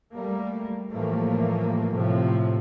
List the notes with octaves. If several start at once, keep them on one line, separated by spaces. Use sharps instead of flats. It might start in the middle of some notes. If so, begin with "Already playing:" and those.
G3 A3 A#3
A2 E3 F3 G3 A3 A#3
A2 C3 F3